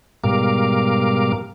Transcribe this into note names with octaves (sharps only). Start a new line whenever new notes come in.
G#2 B2 G3 A#4 F5 D6